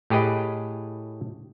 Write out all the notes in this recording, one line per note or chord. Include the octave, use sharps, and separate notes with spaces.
A2 G4 G#4 B4 D#5